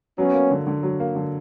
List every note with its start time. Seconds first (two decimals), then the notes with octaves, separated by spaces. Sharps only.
0.18 F#3 B3 C#4
0.34 A#3
0.51 D3
0.67 D3
0.83 F#3
1.00 A#3
1.15 D3